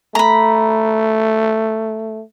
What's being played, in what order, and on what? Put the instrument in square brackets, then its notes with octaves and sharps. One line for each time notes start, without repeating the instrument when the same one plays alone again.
[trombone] A3 [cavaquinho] A#5 B5